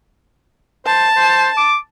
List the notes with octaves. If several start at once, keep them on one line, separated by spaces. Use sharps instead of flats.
C5 A5
C5
D6